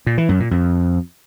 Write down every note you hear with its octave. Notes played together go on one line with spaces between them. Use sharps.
A#2
E3
F#2
A#2
F2